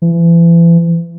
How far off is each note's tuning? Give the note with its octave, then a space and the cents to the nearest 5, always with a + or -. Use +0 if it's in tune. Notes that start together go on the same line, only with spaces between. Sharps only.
E3 +35